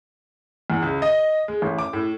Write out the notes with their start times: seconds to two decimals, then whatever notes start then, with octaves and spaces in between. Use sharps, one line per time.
0.70 E2
0.82 C#2
1.02 D#5
1.48 G#3
1.62 A1
1.79 D6
1.93 A2